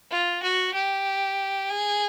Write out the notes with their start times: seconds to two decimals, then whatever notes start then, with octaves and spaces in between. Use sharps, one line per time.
0.11 F4
0.42 F#4
0.74 G4
1.69 G#4